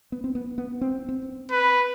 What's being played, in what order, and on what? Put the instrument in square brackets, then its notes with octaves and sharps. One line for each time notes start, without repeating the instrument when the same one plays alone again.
[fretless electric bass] B3
C4
B3
B3
C4
C4
[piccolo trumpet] B4